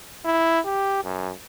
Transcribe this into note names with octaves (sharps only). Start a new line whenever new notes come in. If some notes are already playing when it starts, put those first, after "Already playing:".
E4
G4
F#2